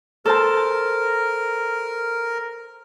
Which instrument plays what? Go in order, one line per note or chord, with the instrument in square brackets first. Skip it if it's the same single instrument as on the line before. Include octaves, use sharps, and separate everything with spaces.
[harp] A4 C5 A5 [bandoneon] A#4